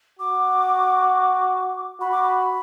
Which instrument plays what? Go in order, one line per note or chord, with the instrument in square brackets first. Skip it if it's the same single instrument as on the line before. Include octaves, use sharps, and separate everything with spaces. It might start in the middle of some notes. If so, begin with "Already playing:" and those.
[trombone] F#4 [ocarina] D6
[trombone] F#4 [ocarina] B5
[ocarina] D6
B5